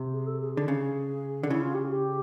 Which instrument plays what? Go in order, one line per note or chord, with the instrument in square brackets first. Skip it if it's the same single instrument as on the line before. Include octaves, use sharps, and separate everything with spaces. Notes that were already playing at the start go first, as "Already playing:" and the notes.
Already playing: [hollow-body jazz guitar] C3
[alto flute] G#4
A4
G#4
[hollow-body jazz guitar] D3 [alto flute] G#4
[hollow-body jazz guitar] C#3
D3
[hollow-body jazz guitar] C#3 [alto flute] E4
[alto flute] F4
G4
G#4
G4